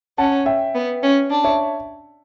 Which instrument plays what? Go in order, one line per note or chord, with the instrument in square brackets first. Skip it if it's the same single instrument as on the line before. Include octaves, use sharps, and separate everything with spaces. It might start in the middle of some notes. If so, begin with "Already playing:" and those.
[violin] C#4 [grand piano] F#5 A5
[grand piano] E5 G5
[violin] B3
C#4
D4
[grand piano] C#5 E5